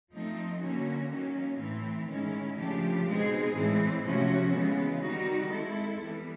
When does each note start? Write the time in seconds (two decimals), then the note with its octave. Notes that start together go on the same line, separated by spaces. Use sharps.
0.12 F3 A3 C4 D#4
0.60 D3 F#3 A#3 C#4 F#4
1.10 D#3 F#3 A#3 C#4
1.58 A2 E3 A3 C4
2.08 D#3 G#3 C#4 E4
2.57 C#3 F3 A3 D4 G4
3.06 B2 G#3 C4 D#4 G#4
3.56 A2 E3 G#3 C4
4.04 C3 F3 A3 C#4 F#4
4.53 C#3 E3 G#3 B3
5.02 D#3 G3 C4 D#4 F#4
5.51 G#3 C4 E4 A4
6.00 E3 G3 B3